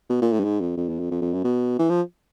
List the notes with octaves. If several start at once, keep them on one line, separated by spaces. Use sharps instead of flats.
B2
A#2
A2
G2
G#2
F2
F2
E2
F2
F2
F2
F#2
B2
E3
F3